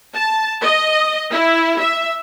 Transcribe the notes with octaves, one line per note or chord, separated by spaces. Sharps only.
A5
D#5
E4
E5